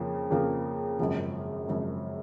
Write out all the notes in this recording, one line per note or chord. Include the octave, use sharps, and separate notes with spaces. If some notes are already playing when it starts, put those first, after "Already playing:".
Already playing: F2 C#3 F3 A#3
F2 C#3 F3 A#3
G#1 F#2 C#3 F3
G#1 F#2 C#3 F3